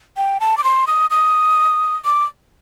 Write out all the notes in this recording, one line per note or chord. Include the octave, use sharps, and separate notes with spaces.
G5
A5
D6
C6
D#6
D#6
D6